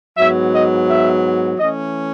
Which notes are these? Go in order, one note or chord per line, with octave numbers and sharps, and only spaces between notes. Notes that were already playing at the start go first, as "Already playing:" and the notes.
G#2 F#3 B3 E5
D#5
E5
E3 A3 C#4 D#5